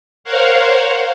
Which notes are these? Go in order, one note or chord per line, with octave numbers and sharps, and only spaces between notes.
A#4 C5 C#5 F5 F#5